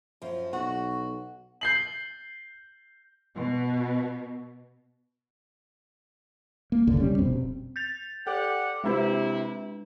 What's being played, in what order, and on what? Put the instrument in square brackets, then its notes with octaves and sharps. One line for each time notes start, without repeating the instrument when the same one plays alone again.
[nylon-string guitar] F#2 F3
[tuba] B1 [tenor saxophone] F#4 [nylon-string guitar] F#5
[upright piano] G6 C7 F#7
[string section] B2
[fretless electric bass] A#3
F#1 C#2 D3
C2 G3 C#4
F1 B2 C4
[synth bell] G6 A6 F7
[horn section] G4 D5 F#5 [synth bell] A4
[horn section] C3 E4 [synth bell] G#3 D4 B4